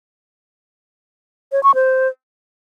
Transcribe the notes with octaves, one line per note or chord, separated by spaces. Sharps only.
C#5
C#6
C5